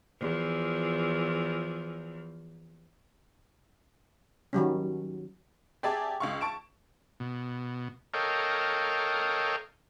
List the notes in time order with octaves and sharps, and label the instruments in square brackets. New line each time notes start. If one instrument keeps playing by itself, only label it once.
[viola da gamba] E2 F3
[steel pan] D#3 F#3 G3 C#4
[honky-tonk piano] G4 G#4 D5 E5 G#5 A5
C#2 F5 C#6
A5 C#6 D7 E7
[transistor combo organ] B2
A4 A#4 C#5 D#5 F5 G5